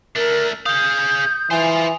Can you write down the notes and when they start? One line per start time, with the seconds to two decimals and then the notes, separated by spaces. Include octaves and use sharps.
0.16 A3 D4 A#4
0.66 G#4 F5 D#6 G6
1.51 E3 F4 C5 G#5 F7